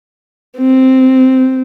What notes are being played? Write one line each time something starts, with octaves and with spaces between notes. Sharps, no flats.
C4